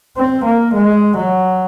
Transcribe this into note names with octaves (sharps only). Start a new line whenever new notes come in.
C4
A#3
G#3
F#3